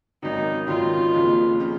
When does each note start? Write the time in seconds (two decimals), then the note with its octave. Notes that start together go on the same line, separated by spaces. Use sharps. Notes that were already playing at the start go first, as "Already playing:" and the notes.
0.22 G#1 F#2 D#3 D#4
0.67 G#1 F#2 D#3 F4
1.14 F#1 F2 C#3 F3
1.60 C#3 F3